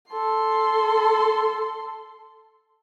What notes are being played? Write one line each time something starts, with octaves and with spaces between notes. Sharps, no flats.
A4 C6